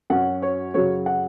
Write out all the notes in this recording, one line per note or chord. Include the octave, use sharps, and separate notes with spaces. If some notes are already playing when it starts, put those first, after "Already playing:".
F#2 F#3 C#4 F#5
C#5
F#2 C#3 F#3 C#5
F#5